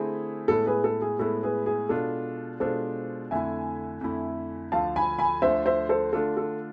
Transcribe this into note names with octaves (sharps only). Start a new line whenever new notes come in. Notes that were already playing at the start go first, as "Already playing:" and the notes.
Already playing: D3 A3 C4 E4 G#4
A2 G#3 B3 E4 A4
G#4 B4
A4
G#4
A2 G#3 B3 E4 A4
G#4 B4
G#4
B2 G#3 D4 F4 A4
B2 G#3 D4 F4 A4 C5
F2 D3 A3 E4 E5 G#5
F2 D3 A3 E4
D2 D3 F3 A3 F5 A5
G#5 B5
G#5 B5
D2 D3 F3 A3 C5 E5
C5 E5
A4 C5
D3 A3 D4 F4 A4
A4